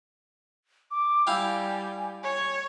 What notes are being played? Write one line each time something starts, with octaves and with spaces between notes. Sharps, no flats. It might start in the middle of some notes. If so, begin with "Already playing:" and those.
D6
G3 E4 F5 G5 G#5
C#5